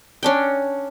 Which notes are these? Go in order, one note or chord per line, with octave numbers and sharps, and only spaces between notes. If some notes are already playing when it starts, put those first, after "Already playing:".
C#4 D4 G5